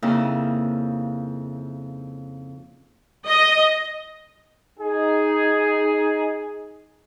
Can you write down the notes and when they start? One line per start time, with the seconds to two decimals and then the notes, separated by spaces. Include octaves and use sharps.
0.02 F2 C#3 A#3 D#4 E4
3.28 D#5
4.79 D#4 G#4